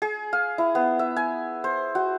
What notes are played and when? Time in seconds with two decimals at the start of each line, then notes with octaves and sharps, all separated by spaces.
0.02 G#4
0.33 F5
0.58 E4
0.75 B3
0.99 E5
1.16 G#5
1.64 C5
1.95 F#4